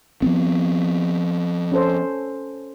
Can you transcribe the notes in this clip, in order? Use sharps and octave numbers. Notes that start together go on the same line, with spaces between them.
F3 B3 C4
C#4 A4 C5